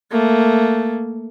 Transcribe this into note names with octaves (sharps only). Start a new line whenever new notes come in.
A3 A#3